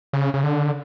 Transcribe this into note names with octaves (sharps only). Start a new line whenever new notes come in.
C#3
C#3
D3